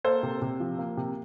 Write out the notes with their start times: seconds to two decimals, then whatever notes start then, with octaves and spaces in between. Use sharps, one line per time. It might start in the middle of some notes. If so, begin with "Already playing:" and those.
0.04 A#3 A4 C5
0.23 C3
0.42 C3
0.60 F3
0.79 A#3
0.97 C3